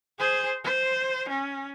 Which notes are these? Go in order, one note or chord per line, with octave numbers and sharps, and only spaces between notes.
G#4 C5
C5
C#4